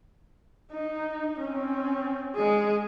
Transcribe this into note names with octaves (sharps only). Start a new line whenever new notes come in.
D#4
C4 C#4
G#3 G#4